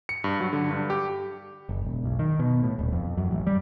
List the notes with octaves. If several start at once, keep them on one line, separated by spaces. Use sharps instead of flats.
C#7
G2
F#3
D3
G2
G4
F#1
E1
B1
D#3
B2
A2
D#1
F2
F#2
A1
G3